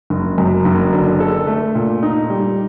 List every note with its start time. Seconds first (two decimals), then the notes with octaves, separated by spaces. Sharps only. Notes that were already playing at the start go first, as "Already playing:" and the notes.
0.10 F#1
0.38 F#2
0.65 F#1
0.93 D3
1.20 A4
1.47 A3
1.75 A#2
2.03 D#4
2.30 G3